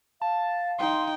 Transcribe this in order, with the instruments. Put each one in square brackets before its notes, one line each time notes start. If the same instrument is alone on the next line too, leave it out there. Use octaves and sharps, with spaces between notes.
[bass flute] F5 [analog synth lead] A5
[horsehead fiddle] D#4 G5 [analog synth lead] C6